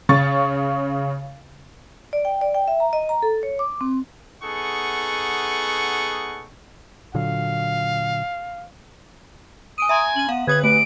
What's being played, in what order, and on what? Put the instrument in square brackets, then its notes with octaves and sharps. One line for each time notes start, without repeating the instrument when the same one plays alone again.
[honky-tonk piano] C#3 C#6 A6
[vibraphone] D5
G5
D5
G5
E5
A#5
D#5
A#5
A4
C#5
D6
C4
[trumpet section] B3 D#4 G#4 A4 F#5 C#6
[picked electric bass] A#2 D3 F#3 [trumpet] F5
[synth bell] G#5 D7 D#7 [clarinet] D#6
[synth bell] E5 A#5 C6 [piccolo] G#5
[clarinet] C#4 [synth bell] D#7 F#7
[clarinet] B3 [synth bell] F5
[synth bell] D3 D#6 F#7 [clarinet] B4 [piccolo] G#6
[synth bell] A3 [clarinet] B4 [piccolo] D7